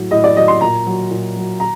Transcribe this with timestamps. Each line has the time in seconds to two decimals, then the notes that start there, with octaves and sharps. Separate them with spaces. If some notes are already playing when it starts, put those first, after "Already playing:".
Already playing: A2 F#3
0.11 A2 D#5
0.24 D5
0.36 F#3 D#5
0.48 C6
0.61 A#2 A#5
0.86 F#3
1.11 A#2
1.36 F#3
1.60 A#5